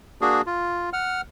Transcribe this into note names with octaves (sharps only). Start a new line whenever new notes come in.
A#3 D4 F#4 G#4
F4
F#5 F6